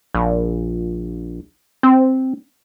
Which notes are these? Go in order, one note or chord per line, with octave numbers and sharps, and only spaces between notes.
A#1
C4